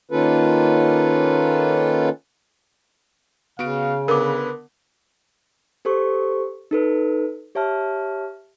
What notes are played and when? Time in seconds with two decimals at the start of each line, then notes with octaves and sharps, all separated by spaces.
0.11 D#3 A#3 C#4 F4 A4 B4
3.59 C#3 B3 F#4 F5 D7
4.08 D3 B3 A#4 B4 D6
5.85 G4 A4 C5 C#6
6.71 D#4 A4 B4
7.55 G4 C#5 E5 A5 F6